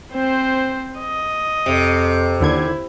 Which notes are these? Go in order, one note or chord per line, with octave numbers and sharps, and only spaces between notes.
C4 C5
D#5
F2 C3
D#2 D3 E4 G#6